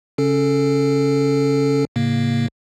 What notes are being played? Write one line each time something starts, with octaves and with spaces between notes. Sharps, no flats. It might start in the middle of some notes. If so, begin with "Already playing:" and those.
C#3 C#4 A4
A2 C#3 A#3